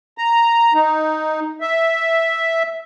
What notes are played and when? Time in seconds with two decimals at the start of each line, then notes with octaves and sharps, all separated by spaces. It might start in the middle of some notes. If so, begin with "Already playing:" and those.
0.18 A#5
0.74 D#4
1.61 E5